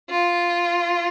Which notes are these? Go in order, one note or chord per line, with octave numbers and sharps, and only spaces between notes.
F4